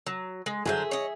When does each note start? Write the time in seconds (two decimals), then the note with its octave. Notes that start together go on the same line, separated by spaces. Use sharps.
0.07 F#3
0.46 G#3
0.66 D3 F#3 G#4 C5 E5
0.91 C#5 D#5